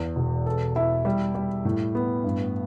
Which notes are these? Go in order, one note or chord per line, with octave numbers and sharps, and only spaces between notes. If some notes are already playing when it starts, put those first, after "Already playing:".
Already playing: E2
E1
A4
E4
G3
G3
A2
B3
G2